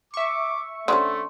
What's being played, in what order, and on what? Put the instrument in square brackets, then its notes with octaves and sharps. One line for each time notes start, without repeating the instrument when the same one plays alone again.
[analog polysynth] E5 C#6 [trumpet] D6
[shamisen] D3 C4 C#4 [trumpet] A3 [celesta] C6